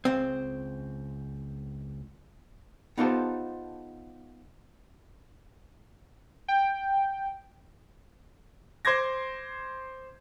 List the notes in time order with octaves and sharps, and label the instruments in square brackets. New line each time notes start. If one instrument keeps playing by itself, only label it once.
[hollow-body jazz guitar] C#2 C4
B3 D#4 F4 G4 A4 C5
[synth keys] G5
[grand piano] C5 C6 D6 G#6 A#6